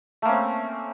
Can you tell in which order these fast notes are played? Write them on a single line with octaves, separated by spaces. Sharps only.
A3 A#3 C#4 C4